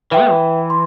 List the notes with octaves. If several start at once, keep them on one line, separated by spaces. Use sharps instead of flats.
E3 B4 E5 G5
B3
E3
C6